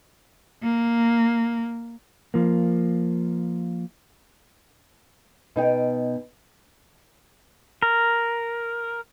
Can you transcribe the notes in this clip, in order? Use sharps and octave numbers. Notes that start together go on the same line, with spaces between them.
A#3
F3 A#3
B2 D#4 G5
A#4